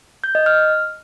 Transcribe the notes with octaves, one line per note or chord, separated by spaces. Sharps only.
G6
D#5
F6